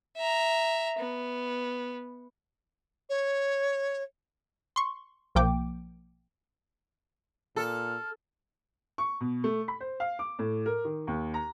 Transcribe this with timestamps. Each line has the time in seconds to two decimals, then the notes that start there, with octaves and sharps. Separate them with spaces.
0.17 E5 A#5
0.99 B3
3.09 C#5
4.76 C6 C#6
5.35 B1 F3 A#3 G5 D6
7.56 A#2 A4 F6
8.98 C#6
9.21 B2
9.44 A3
9.68 B5
9.81 C5
10.00 F5
10.19 D6
10.39 A2
10.66 A#4
10.85 D#3
11.07 D#2
11.34 A#5